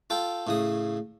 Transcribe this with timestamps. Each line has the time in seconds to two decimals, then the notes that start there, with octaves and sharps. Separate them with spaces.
0.10 F4 A4 G5
0.47 A2 C#3 D#6